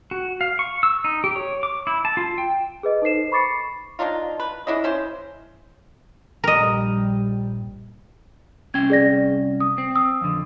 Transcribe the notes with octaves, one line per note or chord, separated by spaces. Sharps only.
F#4
F5
C#6
E6
D#4
G4
C#5
D6
E4
A5
F4
G5
G#4 B4 D#5
D#4 A4 C5 C7 E7
B5 C#6 D6 A6 C7 C#7
A#3 D4 D#4 F4
B4
D4 E4 G#4 D#5
C#4 E4 C5
A#1 G2 G3 A#4 D#5
C2 C#4 G5 G#6
G#4 D5 A#6
D#6
C4
D#6 E6
F2 D3